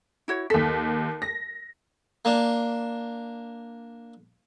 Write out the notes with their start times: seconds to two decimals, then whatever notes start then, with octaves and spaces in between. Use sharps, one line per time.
0.28 E4 F#4 C#5
0.50 D#2 A4 B6
1.22 A#6
2.25 A#3 D4